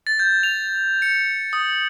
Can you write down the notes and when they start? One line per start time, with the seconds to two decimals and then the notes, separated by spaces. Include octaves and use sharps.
0.07 A6
0.19 G6
0.43 F7
1.02 C#7
1.53 D#6